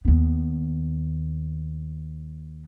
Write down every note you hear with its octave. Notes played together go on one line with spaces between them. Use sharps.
D#2 B3